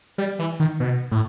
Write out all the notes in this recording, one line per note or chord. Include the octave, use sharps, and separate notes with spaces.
G3
E3
D#3
B2
A2